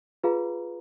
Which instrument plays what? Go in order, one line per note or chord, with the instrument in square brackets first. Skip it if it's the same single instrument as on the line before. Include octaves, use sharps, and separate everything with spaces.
[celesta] F4 G#4 B4 F5 A#5